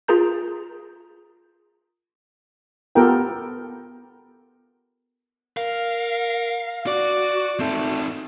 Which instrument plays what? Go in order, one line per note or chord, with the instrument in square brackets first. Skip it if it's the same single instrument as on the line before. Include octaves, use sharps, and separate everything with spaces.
[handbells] F4 G#4 A#4 A#5 G6
[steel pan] B3 F4 G4 A4 A#4 G5
[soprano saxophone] A#4 [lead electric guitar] F5
[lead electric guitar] F#4 [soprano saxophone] D5
[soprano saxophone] A3 [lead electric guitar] C4 D#4